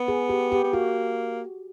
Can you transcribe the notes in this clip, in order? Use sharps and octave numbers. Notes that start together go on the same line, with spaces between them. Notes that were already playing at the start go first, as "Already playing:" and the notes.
Already playing: B3
G#4
G4
G4
B3
A#3 F#4